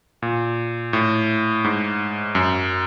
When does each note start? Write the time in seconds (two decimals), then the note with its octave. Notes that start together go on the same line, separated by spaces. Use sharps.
0.22 A#2
0.93 A2
1.64 G#2
2.35 F#2